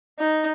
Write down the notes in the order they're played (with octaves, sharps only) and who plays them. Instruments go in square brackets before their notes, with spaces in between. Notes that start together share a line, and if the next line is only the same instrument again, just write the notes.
[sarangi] D#4